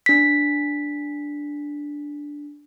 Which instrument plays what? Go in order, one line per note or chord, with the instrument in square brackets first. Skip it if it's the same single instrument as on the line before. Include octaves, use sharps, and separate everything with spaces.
[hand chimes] D4 B6